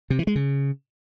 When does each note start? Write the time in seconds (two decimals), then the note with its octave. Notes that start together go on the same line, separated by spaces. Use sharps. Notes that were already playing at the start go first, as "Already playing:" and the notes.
0.10 C3
0.19 E3
0.27 G#3
0.36 C#3